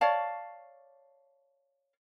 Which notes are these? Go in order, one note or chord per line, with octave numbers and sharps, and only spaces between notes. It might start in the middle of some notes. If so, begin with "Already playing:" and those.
C#5 D5 F5 A5